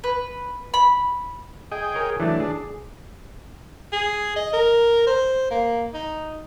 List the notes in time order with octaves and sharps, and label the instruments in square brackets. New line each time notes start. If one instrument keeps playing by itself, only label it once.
[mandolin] B4
B5
[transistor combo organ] G#4 G5 [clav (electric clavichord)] D#5
[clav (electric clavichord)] A#4 C#5
[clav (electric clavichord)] E3 F#3 A3 [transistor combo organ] D4
[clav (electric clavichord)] G#4
[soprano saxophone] G#4
D#5
A#4
C5
A#3
D#4